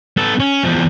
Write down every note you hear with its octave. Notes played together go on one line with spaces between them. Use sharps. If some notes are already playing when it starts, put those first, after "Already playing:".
B3 A4
C#4
E2 F3